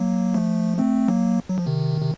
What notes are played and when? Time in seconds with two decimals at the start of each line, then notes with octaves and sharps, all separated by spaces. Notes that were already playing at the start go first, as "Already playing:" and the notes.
Already playing: F#3 A#3
0.34 F3 A3
0.78 A3 C4
1.08 F#3 A#3
1.49 F#3
1.58 F3
1.66 C3 D#3
2.01 C3